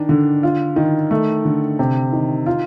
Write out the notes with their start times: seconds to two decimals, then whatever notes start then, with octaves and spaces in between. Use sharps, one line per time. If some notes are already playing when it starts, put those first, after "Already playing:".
Already playing: D#3 D4
0.09 D3
0.43 F4
0.76 D#3
1.11 A3
1.45 D3
1.79 C3
2.13 D#3
2.46 F4